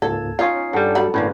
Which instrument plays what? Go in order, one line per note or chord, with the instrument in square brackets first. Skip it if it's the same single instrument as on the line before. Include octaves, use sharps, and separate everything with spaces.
[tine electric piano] C#2 G#2 A#3 [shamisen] A4 [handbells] A5 G#6
[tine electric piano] C#4 D#4 C#5 [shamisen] F4 [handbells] D#6 G#6 C7
[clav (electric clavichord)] G2 G3 [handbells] A4 F#5 A5
[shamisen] F#3 B5
[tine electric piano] G1 B4 [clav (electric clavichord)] A2 D3 A#3 [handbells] C#4